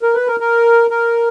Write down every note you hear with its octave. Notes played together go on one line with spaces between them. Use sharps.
A#4
B4
A#4
A#4
A#4